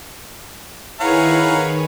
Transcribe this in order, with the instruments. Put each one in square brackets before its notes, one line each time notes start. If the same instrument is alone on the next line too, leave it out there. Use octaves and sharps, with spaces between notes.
[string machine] D#3 [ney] E4 [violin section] G#4 B4 C#5 [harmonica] F5 F#5 A#5